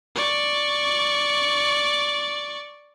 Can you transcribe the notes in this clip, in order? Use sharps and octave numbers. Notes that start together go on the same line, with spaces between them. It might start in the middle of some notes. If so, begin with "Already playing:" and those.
D5 C#6